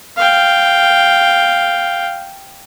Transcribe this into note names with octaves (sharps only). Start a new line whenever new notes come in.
F5 G5